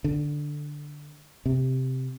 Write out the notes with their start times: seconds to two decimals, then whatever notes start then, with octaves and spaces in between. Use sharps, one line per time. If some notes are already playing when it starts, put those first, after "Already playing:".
0.04 D3
1.46 C3